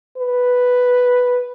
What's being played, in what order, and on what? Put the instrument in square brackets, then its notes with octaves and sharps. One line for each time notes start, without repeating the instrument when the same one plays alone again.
[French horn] B4